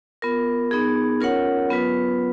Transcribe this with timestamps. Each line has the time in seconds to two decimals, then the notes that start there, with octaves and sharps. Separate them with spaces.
0.22 B3 F4 A#4
0.71 B3 D#4 G#4
1.20 C#4 F4 A#4 C#5 F#5
1.69 F#3 B3 F4 B4